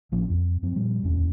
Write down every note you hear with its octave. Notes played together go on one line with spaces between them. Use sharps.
A1 F3 A#3 C#4
F2
F#2 F3 F#3 C4
A#2 F3 G3
D1 E2 C#4